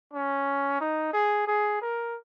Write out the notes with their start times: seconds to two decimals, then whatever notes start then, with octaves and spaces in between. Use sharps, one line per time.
0.13 C#4
0.81 D#4
1.13 G#4
1.48 G#4
1.82 A#4